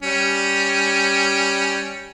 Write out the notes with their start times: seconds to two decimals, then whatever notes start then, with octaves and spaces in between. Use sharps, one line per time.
0.03 G3 C#4